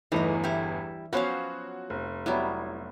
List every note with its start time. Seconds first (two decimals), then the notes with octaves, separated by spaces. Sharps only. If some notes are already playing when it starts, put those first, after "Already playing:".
0.12 G1 E2 E3 A3 D#4 D#5
0.44 G3 E4
1.13 F3 F#3 B3 C#4 F#4 C5 F5
1.90 F1
2.26 F#3 G3 B3 E4